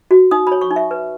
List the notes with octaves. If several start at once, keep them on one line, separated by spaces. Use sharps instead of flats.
F#4
D#4 D#6
C#5 B5
C#6
D#4
E5
B4